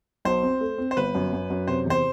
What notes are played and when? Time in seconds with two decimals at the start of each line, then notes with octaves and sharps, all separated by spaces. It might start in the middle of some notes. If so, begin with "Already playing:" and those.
0.25 B1 C5
0.43 C4
0.61 A3
0.78 C4
0.91 C5
0.97 G1 B4
1.15 F#2
1.33 F#2
1.50 F#2
1.67 C3 C5
1.86 E2 C5